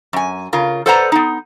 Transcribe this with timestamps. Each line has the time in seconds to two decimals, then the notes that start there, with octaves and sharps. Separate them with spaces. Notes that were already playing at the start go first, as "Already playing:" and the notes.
0.13 F#2 G#5
0.53 C#3 F4 A#4
0.86 A4 B4 C5 D5 F#5 A#5
1.12 B3 D#4